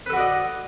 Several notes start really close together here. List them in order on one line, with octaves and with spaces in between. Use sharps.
B4 A4 F#4 D5 D#5